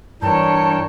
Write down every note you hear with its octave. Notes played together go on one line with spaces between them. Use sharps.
G2 E3 D4 A#4 C#5 G5 A5